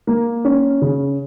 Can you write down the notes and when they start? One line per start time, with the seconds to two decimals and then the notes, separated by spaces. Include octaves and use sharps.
0.07 A#3
0.45 C#4
0.82 C#3